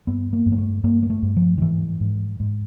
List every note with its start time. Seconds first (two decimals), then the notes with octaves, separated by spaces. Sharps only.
0.07 G2 B3
0.33 A#3
0.46 G2
0.52 A#3
0.58 A3
0.83 G2 A#3
1.03 A#3
1.10 A3
1.22 G2
1.37 F3
1.58 D#3
1.61 G#2 E3
2.00 G#2
2.40 G#2